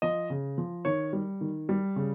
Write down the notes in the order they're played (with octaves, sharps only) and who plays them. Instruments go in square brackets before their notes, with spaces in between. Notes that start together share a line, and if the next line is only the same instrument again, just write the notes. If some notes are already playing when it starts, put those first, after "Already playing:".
[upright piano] F3 D#5
C#3
F3
D#3 C#5
G3
D#3
G3
C#3